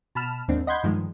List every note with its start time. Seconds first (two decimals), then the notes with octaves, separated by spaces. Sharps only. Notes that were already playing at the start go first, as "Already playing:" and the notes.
0.15 B2 A5 B5 F6 E7
0.48 D#2 G#2 C4 D4
0.67 D#5 F#5 B5 C6 G6 G#6
0.83 G2 D#3 F3 G#3